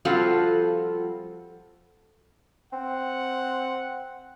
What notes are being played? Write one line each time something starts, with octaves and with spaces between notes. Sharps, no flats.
F3 G3 C4 F4 F#4 A4
C4 F#5